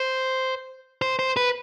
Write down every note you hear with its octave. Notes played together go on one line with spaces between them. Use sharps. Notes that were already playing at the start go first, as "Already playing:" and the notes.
Already playing: C5
C5
C5
B4